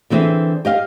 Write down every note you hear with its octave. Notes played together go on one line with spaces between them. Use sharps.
D3 E3 C4 G#4 E5
G4 D#5 F5